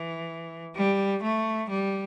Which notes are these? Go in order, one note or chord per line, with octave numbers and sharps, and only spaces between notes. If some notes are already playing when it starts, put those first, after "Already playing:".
Already playing: E3
G3
A3
G3